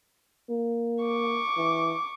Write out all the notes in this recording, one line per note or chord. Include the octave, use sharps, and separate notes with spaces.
A#3
C#6 D6
E3